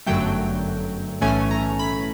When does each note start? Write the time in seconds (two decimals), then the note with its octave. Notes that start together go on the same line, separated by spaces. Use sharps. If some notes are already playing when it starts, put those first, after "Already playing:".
0.06 G1 F#2 D3 F#3 A3 G5
1.21 B1 A2 E3 A3 C#4 G#5
1.51 A#5
1.79 B5